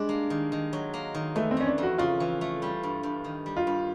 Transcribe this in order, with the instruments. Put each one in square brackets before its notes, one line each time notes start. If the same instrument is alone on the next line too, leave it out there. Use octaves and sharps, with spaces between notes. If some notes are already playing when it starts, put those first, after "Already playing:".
Already playing: [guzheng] G3 D4 [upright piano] G#3
[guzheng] A#3
D#3
D#3
F#3
A#3
D#3
[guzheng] E3 [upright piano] A3
[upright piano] C4
[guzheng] A3 [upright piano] C#4
[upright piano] D4
[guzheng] F2 [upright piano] F#4
[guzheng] C#3 [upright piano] F4
[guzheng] E3
A3
G3
G2
G2
D#3
G3
[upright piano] F4
[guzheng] G2